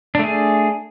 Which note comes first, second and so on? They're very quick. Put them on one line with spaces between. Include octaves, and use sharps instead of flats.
D4 A3 G#4